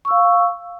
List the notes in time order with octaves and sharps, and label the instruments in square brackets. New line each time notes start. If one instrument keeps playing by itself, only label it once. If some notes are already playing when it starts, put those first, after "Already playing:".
[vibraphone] C#6
E6
F5